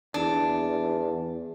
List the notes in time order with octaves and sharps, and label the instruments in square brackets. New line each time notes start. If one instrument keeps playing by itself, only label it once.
[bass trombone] E2 [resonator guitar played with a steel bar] D4